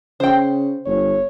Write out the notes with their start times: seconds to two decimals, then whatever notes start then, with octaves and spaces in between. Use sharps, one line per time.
0.20 C#3 C5 G5
0.86 G1 C#5